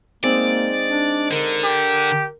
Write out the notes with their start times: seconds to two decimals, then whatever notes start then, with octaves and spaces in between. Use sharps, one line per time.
0.23 G#3 A#3 C4 D#4 D5
0.87 D4
1.31 D3 A#4
1.64 G4